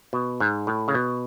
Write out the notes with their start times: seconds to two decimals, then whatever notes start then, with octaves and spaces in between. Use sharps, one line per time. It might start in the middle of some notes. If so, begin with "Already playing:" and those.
0.13 B2
0.40 G#2
0.67 A2
0.88 C#3
0.94 B2